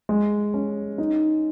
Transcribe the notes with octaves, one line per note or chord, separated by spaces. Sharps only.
G#3
C#4
D#4